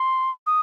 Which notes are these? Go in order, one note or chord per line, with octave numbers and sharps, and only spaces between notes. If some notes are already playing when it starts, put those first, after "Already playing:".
Already playing: C6
D#6